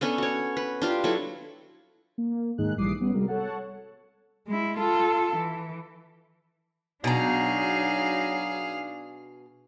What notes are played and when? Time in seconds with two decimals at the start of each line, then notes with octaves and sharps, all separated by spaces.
0.01 B3 C#4 D4 A4
0.18 F#4 C#5
0.57 B4
0.82 D4 F4 G4
1.04 F#3 E4 A4
2.18 A#3
2.58 D#2 G#2 D#3 D#4 G#4 F#6
2.78 A#1 E3 G3 D6 D#6 C7
3.00 G3 B3 C#4
3.14 C3 G3 G#3 F#4 A#4
3.27 A4 C#5 F#5 A5
4.47 G#3 E4
4.78 F4 A4
5.37 E3
7.04 B2 F#3 D4 D#4 G#4 F5 A#5